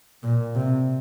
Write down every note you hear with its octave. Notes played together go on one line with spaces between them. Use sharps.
A#2
C3